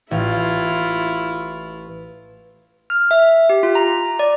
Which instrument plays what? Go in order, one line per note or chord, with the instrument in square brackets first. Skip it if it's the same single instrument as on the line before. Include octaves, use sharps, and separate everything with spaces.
[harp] A1 F5 [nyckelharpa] E4 F4
[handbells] F6
E5
G4
F4
A#5
D5